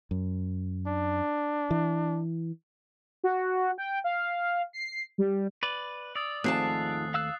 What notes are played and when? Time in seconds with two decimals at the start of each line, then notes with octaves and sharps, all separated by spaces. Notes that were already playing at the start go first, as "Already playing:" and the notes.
0.11 F#2
0.88 D4
1.71 E3
3.24 F#4
3.78 G5
4.04 F5
4.73 C7
5.18 G3
5.63 B4 D5
6.15 D5 D#6 E6 A6
6.44 D#2 G#2 F3 A3 C4 A5 F#6 C7
7.14 F5 E6 F#6